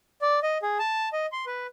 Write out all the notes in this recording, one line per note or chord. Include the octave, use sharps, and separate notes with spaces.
D5
D#5
G#4
A5
D#5
C6
B4